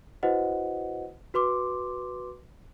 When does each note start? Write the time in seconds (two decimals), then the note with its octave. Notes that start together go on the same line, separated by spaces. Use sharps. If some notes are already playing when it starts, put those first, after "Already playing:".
0.23 E4 F#4 B4 C5 D#5 F#5
1.34 F#4 B4 C6 D6